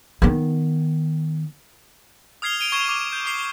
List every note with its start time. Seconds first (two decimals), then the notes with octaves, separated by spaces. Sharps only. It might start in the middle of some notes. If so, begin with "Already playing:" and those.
0.22 D#3 B3
2.42 D#6 F6 G#6 C7 F7 G7
2.59 D7 D#7 F7 G7
2.72 C#6 G#6 E7 G7
2.88 D6
3.13 G6
3.26 D6 C7 G7